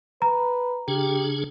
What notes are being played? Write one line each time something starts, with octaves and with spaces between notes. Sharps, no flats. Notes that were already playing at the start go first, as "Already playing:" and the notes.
B4 A#5
C#3 D4 G4 G#4